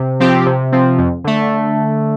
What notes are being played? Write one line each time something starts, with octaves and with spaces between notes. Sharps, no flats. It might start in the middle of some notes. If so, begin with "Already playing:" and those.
Already playing: C3
F3 C4 G4
C3
F3 C4
F2
D3 A3